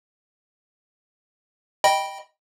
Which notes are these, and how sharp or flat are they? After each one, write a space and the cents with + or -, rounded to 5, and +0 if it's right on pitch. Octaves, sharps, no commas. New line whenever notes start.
D#5 +0 G5 +0 B5 -20